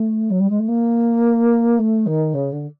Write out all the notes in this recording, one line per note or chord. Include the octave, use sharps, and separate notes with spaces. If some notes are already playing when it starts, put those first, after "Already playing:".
Already playing: A3
F#3
G3
G#3
A3
A#3
A3
D#3
C#3
D3